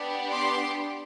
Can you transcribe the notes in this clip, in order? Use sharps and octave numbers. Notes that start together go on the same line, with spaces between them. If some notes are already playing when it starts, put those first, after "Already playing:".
Already playing: B3 D4 G4
C6 D6